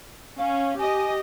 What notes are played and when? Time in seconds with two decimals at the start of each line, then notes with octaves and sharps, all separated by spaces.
0.38 C#4 F5
0.79 G4 D#5 G#5